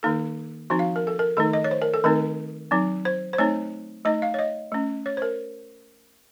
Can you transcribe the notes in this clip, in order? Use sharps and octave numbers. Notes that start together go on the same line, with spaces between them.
D#3 A#3 D#4 A4
F3 C4 D#4 F#4
F5
A#4
A4
A#4
D#3 A3 D#4 A4
D#5
C#5
C5
A#4
A4
D#3 A3 C4 D#4 A#4
F#3 C4 D#4
C5
C5
A3 C4 D#4 C#5
A3 D#4 D#5
F5
C#5
D#5
A3 C#4
C#5
C5
A#4